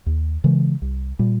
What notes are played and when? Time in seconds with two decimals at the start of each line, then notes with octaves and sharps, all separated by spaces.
0.06 D#2
0.44 C#3 E3 G#3
0.82 C2
1.19 A#2 G3